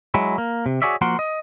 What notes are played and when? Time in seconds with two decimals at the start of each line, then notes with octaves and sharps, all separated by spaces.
0.14 F#3 G#3 E4
0.38 A#3
0.66 C3
0.82 F#4 G#4 C#5 D5 E5
1.01 F3 A#3 F#4 A#4 F#5 C6
1.19 D#5